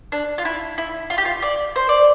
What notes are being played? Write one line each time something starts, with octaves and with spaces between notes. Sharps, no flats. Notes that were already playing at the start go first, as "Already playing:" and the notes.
D4
F4
E4
E4
F4
G4
F4
D5
C5
D5